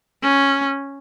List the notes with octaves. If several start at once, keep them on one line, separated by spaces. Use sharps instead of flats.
C#4